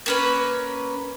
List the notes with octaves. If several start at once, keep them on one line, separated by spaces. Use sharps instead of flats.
A#3 C#4 B4